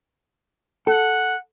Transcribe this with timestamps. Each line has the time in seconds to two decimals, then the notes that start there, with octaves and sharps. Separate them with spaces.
0.87 A4 F#5